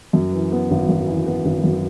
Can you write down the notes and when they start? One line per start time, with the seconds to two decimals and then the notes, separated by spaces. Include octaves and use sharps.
0.13 F#2
0.32 E3
0.52 B3
0.71 G#1
0.89 F#2
1.07 E3
1.26 B3
1.45 G#1
1.64 F#2